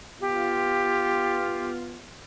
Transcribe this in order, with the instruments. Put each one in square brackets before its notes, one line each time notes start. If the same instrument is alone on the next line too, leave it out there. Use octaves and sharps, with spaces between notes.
[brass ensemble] B3 F4 [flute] G4